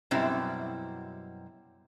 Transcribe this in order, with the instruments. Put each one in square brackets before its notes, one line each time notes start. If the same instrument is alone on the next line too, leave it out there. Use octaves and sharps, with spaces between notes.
[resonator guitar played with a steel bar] F#2 B2 G3 C4 E4